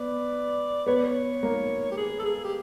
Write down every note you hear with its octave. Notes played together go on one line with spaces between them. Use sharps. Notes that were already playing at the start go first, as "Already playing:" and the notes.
Already playing: B3 B4 D5
B3 B4 C#5
D5
C#5
A#3 A#4
G4
G#4
A4
G#4
G4